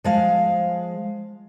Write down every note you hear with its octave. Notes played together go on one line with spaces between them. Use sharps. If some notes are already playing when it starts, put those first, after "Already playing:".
F3 G#3 F5